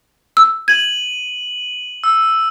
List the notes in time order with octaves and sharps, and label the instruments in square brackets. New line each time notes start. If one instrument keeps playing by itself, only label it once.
[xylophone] E6
[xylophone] G#6 [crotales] D#7 F#7
[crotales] E6